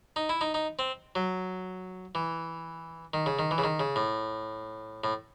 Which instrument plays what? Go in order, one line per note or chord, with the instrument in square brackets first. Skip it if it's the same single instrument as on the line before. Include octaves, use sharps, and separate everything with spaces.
[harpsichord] D#4
E4
D#4
D#4
C4
F#3
E3
D#3
C#3
D#3
E3
C#3
D#3
C#3
A2
A2